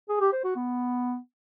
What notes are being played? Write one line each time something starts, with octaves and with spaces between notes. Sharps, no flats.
G#4
G4
C5
F#4
B3